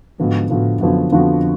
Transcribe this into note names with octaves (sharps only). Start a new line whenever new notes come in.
G#2 D3 F3 B3 F#4
A2 D3 F3 B3 F#4
F#2 D3 F3 B3 F#4
F2 D3 F3 B3 F#4